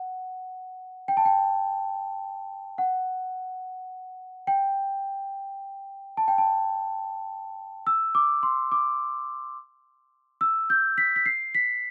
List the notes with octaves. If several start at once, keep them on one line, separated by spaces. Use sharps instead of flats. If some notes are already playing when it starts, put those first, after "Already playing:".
Already playing: F#5
G5
A5
G5
F#5
G5
A5
G5
A5
E6
D6
C6
D6
E6
G6
B6
B6
C7
B6